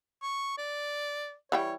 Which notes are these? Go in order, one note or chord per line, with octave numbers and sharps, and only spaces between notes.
C#6
D5
E3 G3 C#5 G5